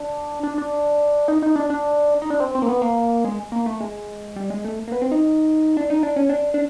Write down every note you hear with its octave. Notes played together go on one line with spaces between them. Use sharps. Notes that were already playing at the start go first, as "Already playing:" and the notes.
Already playing: D4
D4
D4
D#4
D#4
D4
D4
D#4
D4
C4
C4
A#3
B3
A#3
G#3
A#3
A3
G#3
G3
G#3
A3
A#3
B3
C4
D#4
D4
D#4
D4
C#4
D4
D4